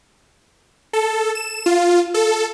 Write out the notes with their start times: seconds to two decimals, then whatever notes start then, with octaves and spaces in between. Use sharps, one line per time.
0.93 A4
1.35 E7
1.66 F4
2.14 A4